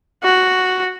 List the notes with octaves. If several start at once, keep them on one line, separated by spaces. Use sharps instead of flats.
F#4